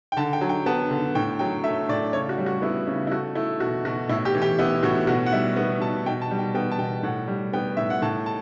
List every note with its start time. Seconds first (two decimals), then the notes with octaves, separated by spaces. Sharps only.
0.12 G5
0.17 D3 A5
0.33 G5
0.41 F#3
0.49 G5
0.66 B3 A5
0.91 D3
1.15 A2 G5
1.39 F#3 G5
1.64 A3 E5
1.89 A2 D5
2.13 C#3 C#5
2.29 F#4
2.38 G3
2.46 F#4
2.62 B3 E4
2.87 C#3
3.07 E4
3.11 A3 F#4
3.35 A3 E4
3.60 B2 F#4
3.85 B2 F#4
4.09 A2 E4
4.25 G4
4.35 E3
4.42 G4
4.59 B3 E4
4.83 A2 F#4
5.07 B2 F#4
5.26 F#5
5.32 G3 E5
5.56 B3
5.81 B2 A5
6.06 B2 G5
6.22 A5
6.31 G3
6.39 G5
6.54 B3 G5
6.72 A5
6.79 B2 G5
7.03 A2 F#5
7.28 G3
7.53 B3 G5
7.77 A2 E5
7.90 F#5
8.02 A2 A5
8.26 A5